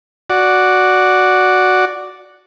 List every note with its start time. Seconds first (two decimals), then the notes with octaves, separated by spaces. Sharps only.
0.30 F#4 D5